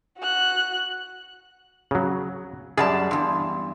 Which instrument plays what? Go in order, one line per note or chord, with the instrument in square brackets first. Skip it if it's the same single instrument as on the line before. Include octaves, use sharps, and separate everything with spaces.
[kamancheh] F#4 F#6
[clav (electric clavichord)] C#3 F#3 [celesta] D#6
[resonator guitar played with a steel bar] F#2 G3 A5 [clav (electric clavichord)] G#4 [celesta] D5 F#5 A6
[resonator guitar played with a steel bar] E2 G2 [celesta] C6